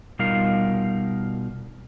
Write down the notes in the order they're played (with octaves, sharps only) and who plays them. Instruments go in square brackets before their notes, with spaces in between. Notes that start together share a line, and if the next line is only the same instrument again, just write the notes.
[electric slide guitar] B2 G3 D#4 F4 A#4 F5